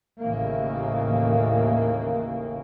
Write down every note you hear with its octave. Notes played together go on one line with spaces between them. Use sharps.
A1 D#2 A2 C#3 E3 A#3